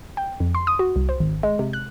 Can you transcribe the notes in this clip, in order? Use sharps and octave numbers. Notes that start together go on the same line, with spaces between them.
G5
F2
C6
D#6
F#4
C2
C5
G#1
G#3
C3
F#6